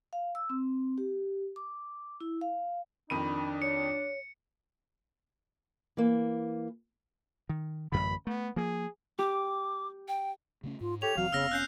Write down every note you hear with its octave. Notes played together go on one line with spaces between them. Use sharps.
F5
E6
C4
G4
D6
E4
F5
F2 D#3 D4 B5 D#7
C#5 C#7
E3 A#3
D#3
A1 F#2 D3 B5
A3 B3
F3 A#3 G#4
G4 D6
G5
C#3 A3 C#4
G#2 F4
G4 A4 C#5 F7
F1 E3 F#3 C4 F5
F1 C#3 B3 C4 E6 F6 A#6
C#4 F#6 G6 C7